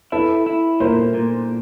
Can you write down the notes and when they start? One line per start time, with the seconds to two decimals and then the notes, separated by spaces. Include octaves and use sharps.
0.12 E4 A4 B4
0.46 E4
0.80 A#2 A#4 C5
1.14 A#2